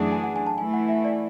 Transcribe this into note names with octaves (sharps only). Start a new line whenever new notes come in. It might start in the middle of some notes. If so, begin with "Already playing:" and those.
Already playing: F#2 E3 A3 D4 G#4 F#5
G#5
F#5
G#5
A5
E3 A3 E4 G#5
F#5
E5
D5